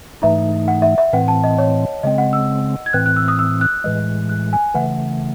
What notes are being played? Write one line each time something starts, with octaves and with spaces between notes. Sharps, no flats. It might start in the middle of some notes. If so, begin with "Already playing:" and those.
G#2 E3 A3 D#4 E5
F#5
E5
E5
A2 E3 C4 F#5
A5
D#5
C#5
C#3 G#3 C4 D#5
F#5
E6
G#6
A2 E3 C4 F#6
F#6
E6
D#6
E6
F#6
A2 E3 G#3
F#6
G#5
C#3 E3 A3 F#5